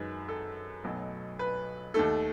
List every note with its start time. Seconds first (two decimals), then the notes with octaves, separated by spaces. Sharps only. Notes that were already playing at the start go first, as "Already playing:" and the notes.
Already playing: F#2 D#3 G#3 B4
0.29 A4
0.84 B1 B2 F#3 A3
1.39 B4
1.94 D#2 D#3 A3 A4